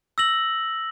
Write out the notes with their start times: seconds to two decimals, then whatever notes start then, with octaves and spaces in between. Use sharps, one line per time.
0.18 E6 A#6 F#7